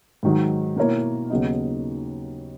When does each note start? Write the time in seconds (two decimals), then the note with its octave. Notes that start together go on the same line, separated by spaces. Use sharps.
0.23 G#2 D#3 F#3
0.76 B2 A#3 E4 A#4 C#5
1.30 D#2 C#3 F#3 B3 D#4